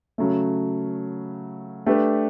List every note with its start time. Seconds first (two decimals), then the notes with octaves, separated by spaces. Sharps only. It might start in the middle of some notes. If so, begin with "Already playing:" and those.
0.18 C#3 F#3 A3
1.86 A3 D4 G4 B4